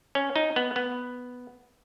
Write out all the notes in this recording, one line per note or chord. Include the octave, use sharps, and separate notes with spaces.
C#4
D#4
B3
B3